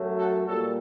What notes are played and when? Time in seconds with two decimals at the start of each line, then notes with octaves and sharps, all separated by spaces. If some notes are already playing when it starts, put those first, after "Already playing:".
Already playing: F#2 F#3 A3
0.18 F#4 A4
0.46 A#2 G3 F#4 A4